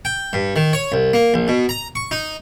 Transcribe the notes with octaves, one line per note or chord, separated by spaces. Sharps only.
G5
G2
D#3
C#5
C2
A#3
A#1
B2
A#5
C#6
D#4